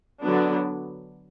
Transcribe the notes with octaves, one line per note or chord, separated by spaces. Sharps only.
D3 F#3 B3 D4